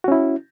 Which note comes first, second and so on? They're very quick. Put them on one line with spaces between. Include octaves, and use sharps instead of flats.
F#4 C#4 E4